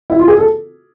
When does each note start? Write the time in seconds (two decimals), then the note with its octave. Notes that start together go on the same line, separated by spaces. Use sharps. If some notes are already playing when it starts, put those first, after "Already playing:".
0.10 E4
0.19 F4
0.28 G#4
0.38 A4